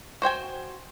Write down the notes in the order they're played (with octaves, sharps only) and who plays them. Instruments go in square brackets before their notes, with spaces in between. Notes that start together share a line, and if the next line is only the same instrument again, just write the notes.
[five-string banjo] F#4 C5 G5 G#5